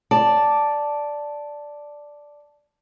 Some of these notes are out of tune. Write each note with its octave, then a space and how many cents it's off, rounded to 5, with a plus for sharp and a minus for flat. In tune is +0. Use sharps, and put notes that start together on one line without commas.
D5 +0 A5 +0